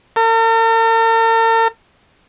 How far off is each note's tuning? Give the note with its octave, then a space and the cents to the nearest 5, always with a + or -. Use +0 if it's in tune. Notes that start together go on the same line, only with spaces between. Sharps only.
A#4 -45